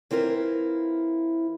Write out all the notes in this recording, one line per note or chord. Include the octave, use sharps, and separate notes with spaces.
E3 C4 E4 F4 A#4